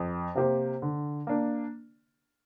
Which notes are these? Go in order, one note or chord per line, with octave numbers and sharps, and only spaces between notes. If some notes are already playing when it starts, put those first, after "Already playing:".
Already playing: F2
C3 A#3 G4 C5
D3
A#3 D4